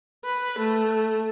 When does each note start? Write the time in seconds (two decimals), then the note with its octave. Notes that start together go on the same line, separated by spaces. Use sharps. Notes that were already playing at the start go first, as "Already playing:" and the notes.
0.25 B4
0.59 A3